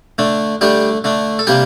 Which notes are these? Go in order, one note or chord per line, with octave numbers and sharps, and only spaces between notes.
D3 A3 D4
D3 G3 A3 D4 G4
D3 A3 D4
A4
C3 G3 A#3 D4 G4